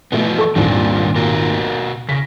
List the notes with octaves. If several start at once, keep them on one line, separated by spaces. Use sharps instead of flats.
B2 E3 F3 A3 B3
A4 C#6
G#1 D#2 A#2 G3 A#3 D4
B2 F#4 A#4
C#3 A#6 B6